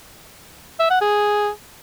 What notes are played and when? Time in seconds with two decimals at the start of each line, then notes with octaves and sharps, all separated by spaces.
0.80 E5
0.91 F#5
1.01 G#4